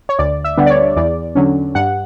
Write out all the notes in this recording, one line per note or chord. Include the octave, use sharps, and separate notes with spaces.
C#5
D2 D5
E5
D3 G3 B3 D4
D5
C#5
E2 D5
D3 F#3 C#4
G2 F#5